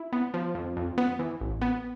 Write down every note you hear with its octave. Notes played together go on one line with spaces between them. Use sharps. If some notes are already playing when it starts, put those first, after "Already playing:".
Already playing: E4
B3
F3
F2
F2
B3
E3
A1
B3